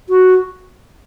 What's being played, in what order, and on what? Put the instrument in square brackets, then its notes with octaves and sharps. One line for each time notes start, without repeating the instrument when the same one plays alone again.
[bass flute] F#4